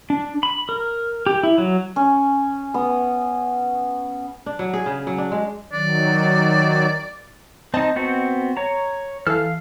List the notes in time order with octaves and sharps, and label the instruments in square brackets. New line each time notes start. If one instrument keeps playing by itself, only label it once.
[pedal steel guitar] D4
B5
A#4
G4
E4
F#3
[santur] C#4
B3 D#6
[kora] D4
F#3
G#4
C#3
F#3
D4
G#3
[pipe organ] D#3 F#3 [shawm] D5
[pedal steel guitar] C4 D#4 [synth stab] D#5 A5
[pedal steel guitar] B3 C4 F#4
C#5 A#5
[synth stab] E3 A4 [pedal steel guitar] F5 F6